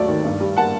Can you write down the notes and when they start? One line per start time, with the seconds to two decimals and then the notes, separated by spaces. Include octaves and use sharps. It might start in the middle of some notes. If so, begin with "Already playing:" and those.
Already playing: D#2 F#3 A3 D5
0.08 D#3
0.25 G2
0.40 G3
0.57 A#3 F#5 A5